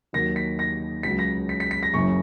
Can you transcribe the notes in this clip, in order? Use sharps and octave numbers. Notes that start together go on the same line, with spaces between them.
D#2 D#3 F#3 A#6
B6
A#6
C#2 C#3 F#3 B6
A#6
B6
B6
B6
A#6
F#1 F#2 C#3 E3 C#6